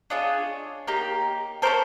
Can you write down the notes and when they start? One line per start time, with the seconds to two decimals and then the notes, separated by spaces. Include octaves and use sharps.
0.10 D4 F4 G#4 C#5 D#5
0.87 A#3 D#4 G4
1.62 C#4 F#4 A4 A#4 C5